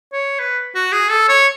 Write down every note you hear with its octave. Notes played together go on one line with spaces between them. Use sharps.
C#5
B4
F#4
G#4
A4
C#5